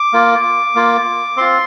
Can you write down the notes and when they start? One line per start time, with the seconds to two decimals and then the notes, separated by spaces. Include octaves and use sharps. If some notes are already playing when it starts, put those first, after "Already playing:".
Already playing: D6
0.13 A#3 F4
0.75 A#3 F4
1.37 C4 F4 C6